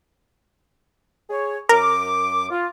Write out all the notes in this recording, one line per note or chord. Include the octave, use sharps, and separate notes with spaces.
G#4 C#5
F#2 A#4 D6
F4